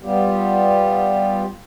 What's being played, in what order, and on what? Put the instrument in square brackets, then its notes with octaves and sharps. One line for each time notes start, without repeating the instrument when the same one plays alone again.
[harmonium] G3 B3 F4 G4